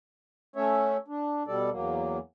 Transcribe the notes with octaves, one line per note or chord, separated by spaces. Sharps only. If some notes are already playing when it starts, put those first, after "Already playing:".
A3 C#4 C#5 E5
D4
B2 G3 A4 D5
E2 F#3 A#3